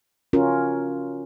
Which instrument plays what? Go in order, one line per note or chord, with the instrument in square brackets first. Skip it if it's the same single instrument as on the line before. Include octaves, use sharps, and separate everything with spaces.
[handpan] C#4 F4 F#4 A#4